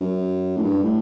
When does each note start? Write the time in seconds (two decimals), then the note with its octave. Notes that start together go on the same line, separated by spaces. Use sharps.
0.01 F#2
0.57 A2
0.63 G2
0.82 A2